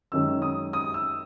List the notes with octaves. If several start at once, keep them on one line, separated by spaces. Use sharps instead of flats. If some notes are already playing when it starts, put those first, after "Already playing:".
F#2 D#3 G#3 C#4 E6
D#6
D#6
E6